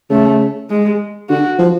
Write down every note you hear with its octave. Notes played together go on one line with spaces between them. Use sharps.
C#3 A3
G#3
D3 F#4
F3